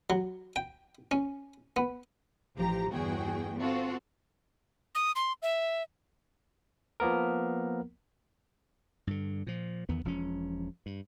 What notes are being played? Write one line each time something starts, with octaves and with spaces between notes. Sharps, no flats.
F#3
G5
C#4
B3
A1 F3 G4 A#5
G1 E2 F#4 G#4 G5
C4 F4 F#4 A4
D#6
C6
E5
F3 A#3 B3 A#4
G2 D3
A#2 F3
E2 D#3 B3
E1 F3 C4 C#4
G2